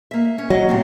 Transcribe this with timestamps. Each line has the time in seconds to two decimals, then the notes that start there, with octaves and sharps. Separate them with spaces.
0.11 A#3 E5
0.38 C#4
0.50 F#3 D#5
0.69 A2 C3 C4